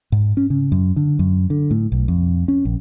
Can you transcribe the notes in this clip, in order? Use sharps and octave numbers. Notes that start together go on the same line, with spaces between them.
G#2
C#4
C#3
F#2
D3
F#2
D3
A2
B1
F2
C#4
A#1